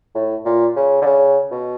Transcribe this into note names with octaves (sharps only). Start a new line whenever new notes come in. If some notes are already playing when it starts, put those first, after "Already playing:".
A2
A#2
C#3
D3
C#3
B2